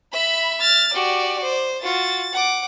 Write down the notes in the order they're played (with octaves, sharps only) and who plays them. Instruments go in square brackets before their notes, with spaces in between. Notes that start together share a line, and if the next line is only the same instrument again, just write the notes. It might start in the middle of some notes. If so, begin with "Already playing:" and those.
[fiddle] E5 [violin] B5
[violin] F6 A6
[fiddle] F#4 G4 [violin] D5
[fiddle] C5
[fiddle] F4 F#4 [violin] A6
[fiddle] F#5 D6